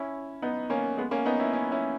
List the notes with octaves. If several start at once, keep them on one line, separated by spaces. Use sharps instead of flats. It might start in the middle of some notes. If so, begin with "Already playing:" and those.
Already playing: C#4 E4
B3 D#4
A#3 C#4
G#3 B3
A#3 C#4
B3 D#4
C#4 E4
C#4 E4
C#4 E4